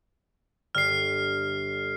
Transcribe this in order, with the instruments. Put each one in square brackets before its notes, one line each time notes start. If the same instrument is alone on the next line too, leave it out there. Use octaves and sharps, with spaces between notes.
[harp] G1 G2 [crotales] F6 C7